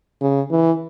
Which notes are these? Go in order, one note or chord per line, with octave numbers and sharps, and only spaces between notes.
C#3
E3